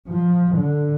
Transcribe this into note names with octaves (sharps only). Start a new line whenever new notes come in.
F3
D3